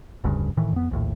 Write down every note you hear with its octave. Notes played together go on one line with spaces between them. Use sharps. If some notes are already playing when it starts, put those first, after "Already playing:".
F1 D2 G2 C#3
A2 D#3 E3
F2 B3
A#1 D#2 A2